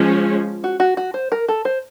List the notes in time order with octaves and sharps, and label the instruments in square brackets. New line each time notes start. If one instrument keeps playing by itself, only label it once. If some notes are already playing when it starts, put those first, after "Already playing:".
Already playing: [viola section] F3 G#3 C#4 [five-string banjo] F4
[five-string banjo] F#4
F#4
F#4
C5
A#4
A4
C5